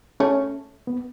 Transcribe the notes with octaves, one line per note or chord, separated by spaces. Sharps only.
A3 C#4
B3